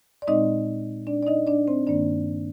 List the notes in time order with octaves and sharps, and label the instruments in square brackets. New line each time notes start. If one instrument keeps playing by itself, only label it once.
[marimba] D5
A#2 G#3 C4 D#4 D#5
D4 D5
D5
D#4 D#5
D4 D5
C4 C5
G2 D#3 A#3 D4 D5